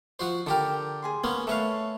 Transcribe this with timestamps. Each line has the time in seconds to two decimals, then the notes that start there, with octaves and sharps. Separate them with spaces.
0.19 F3 F#4 C5
0.47 D3 G4 A4 A#4 G5
1.02 G#4 G#5 C6
1.24 A#3 B3 C#4
1.47 A3 A4 B4 C#5 F5 C#6